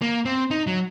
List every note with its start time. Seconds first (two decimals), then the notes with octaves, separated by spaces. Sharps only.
0.02 A#3
0.25 C4
0.51 D#4
0.67 F#3